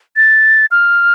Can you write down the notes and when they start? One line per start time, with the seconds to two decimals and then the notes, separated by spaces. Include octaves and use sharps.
0.16 A6
0.71 F6